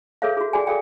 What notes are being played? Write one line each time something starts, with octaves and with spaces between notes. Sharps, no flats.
G#4 A4 B4 C#5 E5 F5
F#4 G#4
F#4 G#4 D5 G5 G#5
G#4 A4 D5 F5 G5